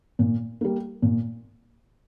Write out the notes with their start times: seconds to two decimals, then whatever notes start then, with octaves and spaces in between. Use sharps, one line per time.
0.19 A#2
0.61 G3 A#3
1.02 A#2